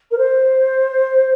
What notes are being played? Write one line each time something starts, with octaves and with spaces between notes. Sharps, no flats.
A#4
C5